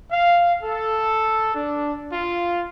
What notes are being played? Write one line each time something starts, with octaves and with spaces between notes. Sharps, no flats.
F5
A4
D4
F4